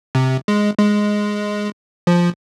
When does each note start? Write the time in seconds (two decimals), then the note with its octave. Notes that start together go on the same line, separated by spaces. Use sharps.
0.15 C3
0.48 G#3
0.79 G#3
2.07 F3